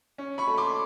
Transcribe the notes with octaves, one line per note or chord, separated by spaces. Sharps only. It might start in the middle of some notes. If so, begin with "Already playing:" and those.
C#4
B5 C#6
A3
C6 D6